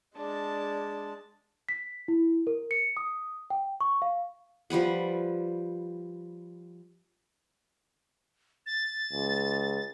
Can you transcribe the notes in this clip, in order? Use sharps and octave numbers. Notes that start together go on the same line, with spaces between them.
G#3 D4 A5
B6
E4
A#4
C#7
D#6
G5
C#6
F5
F3 G3 B4 F#5
A6
C#2